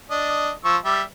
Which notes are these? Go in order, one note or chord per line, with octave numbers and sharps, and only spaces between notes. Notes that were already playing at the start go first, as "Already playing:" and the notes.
D4 D#5
F3 C#6 E6
G3 D5 E5